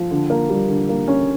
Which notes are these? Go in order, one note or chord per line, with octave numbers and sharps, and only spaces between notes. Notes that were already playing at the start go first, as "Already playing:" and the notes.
Already playing: F3
D3
A#3
G3
D3
A#3
C#4